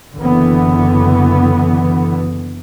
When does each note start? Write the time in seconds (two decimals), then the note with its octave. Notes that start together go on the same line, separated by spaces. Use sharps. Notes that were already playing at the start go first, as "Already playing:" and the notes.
0.16 F#1 D3 E3 B3